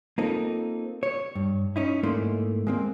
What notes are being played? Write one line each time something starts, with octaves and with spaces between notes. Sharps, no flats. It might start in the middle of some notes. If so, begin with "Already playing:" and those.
A#3 C4 D#4 F4 A4
C#5
G2
C#4 D#4 E4
G#2 A3 A#3 E4 D5 C6
G#3 A#3 C4